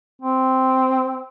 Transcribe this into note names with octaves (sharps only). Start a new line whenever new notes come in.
C4